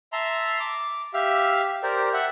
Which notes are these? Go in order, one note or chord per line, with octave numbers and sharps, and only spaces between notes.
E5 A5 A#5 C6
D6
G4 E5 F5
G4 A#4 C5 D5
E5 F#5